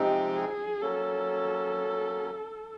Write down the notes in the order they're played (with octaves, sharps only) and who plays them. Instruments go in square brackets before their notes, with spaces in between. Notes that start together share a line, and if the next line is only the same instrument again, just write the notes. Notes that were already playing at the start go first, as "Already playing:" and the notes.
Already playing: [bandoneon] C3 F3 G#3 C4 D#4 [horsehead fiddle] G4
[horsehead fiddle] G#4
[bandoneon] F#3 A#3 C#4 [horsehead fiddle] A4